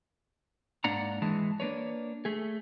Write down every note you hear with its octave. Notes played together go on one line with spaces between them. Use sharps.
G#2 A#3 D4 F#5 A#5
E3 G#3 A5
A#3 D4 B4 C#5
A3 G#4